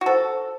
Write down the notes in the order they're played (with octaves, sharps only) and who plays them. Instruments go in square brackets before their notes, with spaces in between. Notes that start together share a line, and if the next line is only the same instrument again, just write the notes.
[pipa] F#4
[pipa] A4 [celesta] C5